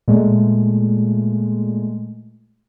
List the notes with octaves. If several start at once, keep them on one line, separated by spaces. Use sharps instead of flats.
A#2 G#3 A3